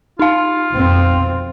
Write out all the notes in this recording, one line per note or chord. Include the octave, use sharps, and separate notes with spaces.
D#4 F4 F5
F2 B2 C4